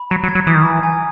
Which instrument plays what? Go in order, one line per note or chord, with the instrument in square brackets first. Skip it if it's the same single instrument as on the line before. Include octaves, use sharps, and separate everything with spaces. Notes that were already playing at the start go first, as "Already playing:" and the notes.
Already playing: [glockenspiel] B5
[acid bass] F#3 [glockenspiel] A#5
[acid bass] F#3
[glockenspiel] G#6
[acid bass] F#3
[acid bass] E3 [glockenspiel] D#6
[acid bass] D#3
[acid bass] E3 [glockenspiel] A#5
[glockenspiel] G#5